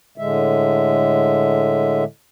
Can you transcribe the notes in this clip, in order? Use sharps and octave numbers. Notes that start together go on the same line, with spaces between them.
A2 D3 G#3 E5